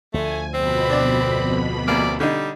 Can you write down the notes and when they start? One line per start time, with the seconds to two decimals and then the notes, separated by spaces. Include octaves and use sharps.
0.14 D2 F3 A3 G#5
0.54 F2 B2 C4 B5
0.90 D4 D5
1.88 C2 A#3 D5
2.20 D3 G3 D#4